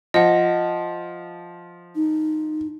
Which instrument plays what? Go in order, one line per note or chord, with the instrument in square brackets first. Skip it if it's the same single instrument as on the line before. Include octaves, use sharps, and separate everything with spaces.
[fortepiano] F3 [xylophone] D#5 F#5
[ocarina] D#4